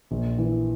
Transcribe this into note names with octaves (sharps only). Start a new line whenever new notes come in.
A#1
E3